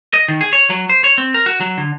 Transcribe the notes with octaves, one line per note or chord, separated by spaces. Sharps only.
D#5
D#3
G#4
C#5
F#3
C5
C#5
C4
A#4
F#4
F#3
D3